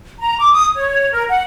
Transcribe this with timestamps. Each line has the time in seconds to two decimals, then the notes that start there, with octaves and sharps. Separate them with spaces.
0.19 A#5
0.39 D6
0.52 D#6
0.76 C#5
1.13 A#4
1.29 F#5